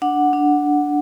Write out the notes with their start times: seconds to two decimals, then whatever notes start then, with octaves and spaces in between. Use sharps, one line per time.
0.02 D4 F#5
0.33 D4